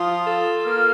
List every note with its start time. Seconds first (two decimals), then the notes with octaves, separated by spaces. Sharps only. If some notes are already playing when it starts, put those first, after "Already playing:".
Already playing: F3 F4 D#6
0.27 A4
0.65 A#3 F6